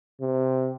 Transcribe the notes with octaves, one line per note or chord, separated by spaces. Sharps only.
C3